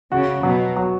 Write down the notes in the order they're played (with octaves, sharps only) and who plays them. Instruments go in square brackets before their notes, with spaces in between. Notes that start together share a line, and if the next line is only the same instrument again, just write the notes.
[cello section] C#3 [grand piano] F#4
[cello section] B2 [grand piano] F#3
[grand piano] F#3